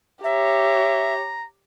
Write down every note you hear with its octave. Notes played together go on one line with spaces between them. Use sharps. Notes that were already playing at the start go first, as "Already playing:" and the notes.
G4 C#5 E5 A#5